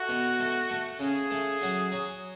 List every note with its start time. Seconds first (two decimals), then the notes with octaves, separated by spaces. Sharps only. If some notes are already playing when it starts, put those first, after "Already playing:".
Already playing: A3 F#4
0.09 B2
0.39 A3
0.70 A3
0.99 C#3 G#4
1.31 A3
1.61 F#3
1.92 F#3